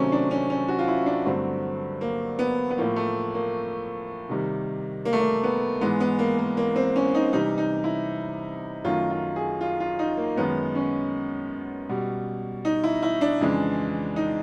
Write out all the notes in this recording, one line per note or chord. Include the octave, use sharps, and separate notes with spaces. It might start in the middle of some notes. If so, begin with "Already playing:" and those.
Already playing: C3 D#3 F#3 A3 C4 C#4
D4
C#4
C#4
F#4
F4
E4
D4
G2 D3 F#3 A3 C4
A#3
B3
B3
A2 F3 A3 A#3
A3
A#3
C3 D#3 G3
A#3
A3
A#3
B3
G#2 E3 G#3 B3
B3
A#3
A#3
A#3
C4
C#4
D#4
C3 E3 G3 D#4
D#4
E4
F#2 D#3 F#3 A3 F4
F4
G#4
F4
F4
D#4
A#3
F#2 D#3 G#3 B3
C#4
B2 G3
D#4
E4
E4
D4
F2 C#3 E3 G#3
D#4